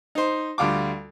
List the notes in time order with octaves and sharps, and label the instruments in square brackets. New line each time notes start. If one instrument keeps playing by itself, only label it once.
[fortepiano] D#4 C5
D2 G3 F4 D6